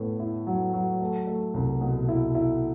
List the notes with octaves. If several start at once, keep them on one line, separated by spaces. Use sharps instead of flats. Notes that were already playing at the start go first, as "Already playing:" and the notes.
Already playing: A2 B3
E4
F#3
F#3
A3
A3
C2
B2
E4
E4